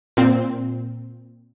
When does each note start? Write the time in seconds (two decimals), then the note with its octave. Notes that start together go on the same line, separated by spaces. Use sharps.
0.17 A#2 C4